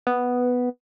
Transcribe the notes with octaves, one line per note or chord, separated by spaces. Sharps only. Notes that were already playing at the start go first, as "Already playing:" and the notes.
B3